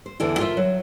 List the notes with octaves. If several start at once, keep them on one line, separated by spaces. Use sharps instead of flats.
C5
E2 D3 E3 E4
F4 A#4 C5 D5 E5
F#3